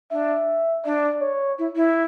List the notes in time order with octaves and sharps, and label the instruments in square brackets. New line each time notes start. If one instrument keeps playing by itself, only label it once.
[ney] D4 [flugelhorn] E5
[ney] D4 [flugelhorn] D5
[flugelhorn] C#5
[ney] E4
E4